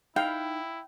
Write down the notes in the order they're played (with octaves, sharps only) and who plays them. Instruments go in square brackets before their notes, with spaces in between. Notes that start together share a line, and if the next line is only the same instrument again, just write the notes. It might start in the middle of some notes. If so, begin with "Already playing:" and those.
[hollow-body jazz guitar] D#4 B5 [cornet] E4 [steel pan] F5 [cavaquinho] G5